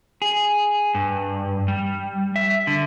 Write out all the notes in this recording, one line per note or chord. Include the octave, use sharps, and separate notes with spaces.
G#4
G2
G3
E5
D3